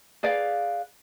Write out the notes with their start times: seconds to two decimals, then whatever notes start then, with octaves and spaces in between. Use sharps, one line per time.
0.23 G#4 B4 D5 F5